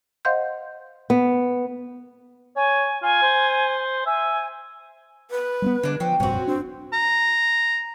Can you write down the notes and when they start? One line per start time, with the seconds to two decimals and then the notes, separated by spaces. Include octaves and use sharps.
0.25 C5 D#5 F5 F#5 C6 G6
1.10 B3
2.56 C#5 G#5
3.03 F4 G#5
3.22 C5
4.06 E5 G#5
5.31 B4
5.62 G3 A#3 B3
5.83 D3 G#3 D4
6.00 F3 C4 C#4
6.20 F1 A#1 G2 C4 C#4 F#4
6.47 C4 D4
6.93 A#5